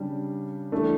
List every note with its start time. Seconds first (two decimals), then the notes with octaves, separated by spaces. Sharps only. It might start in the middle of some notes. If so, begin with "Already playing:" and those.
Already playing: C#3 G3 D4 G4
0.72 E3 A3 D4